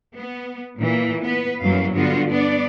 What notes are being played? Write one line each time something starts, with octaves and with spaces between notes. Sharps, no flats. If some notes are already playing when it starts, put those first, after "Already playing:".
B3
A#2 E3 A#3
B3 B4
F#2 E3 F#3 G3 A#3 F5
G2 D3 B3 F4 F#4
B3 D4 D5